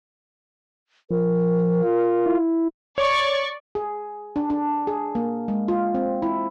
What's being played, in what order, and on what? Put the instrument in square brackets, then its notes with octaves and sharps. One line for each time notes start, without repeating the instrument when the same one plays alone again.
[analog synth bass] F3 [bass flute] A#4
[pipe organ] F4
[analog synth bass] E4
[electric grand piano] C#5 [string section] D5 C#6
[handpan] G#4
D4
D4
G#4
A#3
G#3
F4
C4
E4